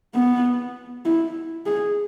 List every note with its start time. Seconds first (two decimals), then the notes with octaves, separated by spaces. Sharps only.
0.15 B3
1.05 E4
1.66 G#4